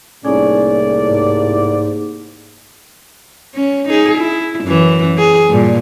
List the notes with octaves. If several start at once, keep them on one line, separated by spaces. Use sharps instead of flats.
C2 A2 A#3 C#4 D#4 G#4 D5
G#2
C#4
D#4 G#4
E4
F#2 E3
G#4
G2 A#2